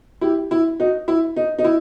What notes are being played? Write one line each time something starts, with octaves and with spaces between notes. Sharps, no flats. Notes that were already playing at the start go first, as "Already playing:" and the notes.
E4 G4
E4
D#4 F#4
E4
D#4
D#4
E4